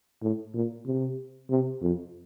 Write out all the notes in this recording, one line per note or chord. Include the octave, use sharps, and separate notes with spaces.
A2
A#2
C3
C3
F2